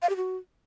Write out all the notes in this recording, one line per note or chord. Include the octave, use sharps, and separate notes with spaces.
F5
G4
F#4